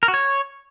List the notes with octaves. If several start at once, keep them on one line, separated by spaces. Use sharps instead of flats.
A#4
F#4
C#5